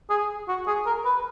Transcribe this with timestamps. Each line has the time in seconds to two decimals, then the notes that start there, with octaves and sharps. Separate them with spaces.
0.10 G#4
0.48 F#4
0.67 G#4
0.86 A#4
1.05 B4